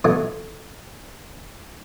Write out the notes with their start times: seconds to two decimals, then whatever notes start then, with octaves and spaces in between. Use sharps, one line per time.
0.04 B2 E3 F#3 A3